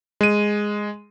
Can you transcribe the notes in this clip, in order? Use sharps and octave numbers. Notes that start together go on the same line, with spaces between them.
G#3 D#7